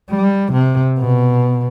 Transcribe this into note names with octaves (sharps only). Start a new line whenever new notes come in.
G3
C3
B2